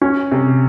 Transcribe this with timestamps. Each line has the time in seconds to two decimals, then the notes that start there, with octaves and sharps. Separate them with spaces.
0.02 C#4
0.32 C3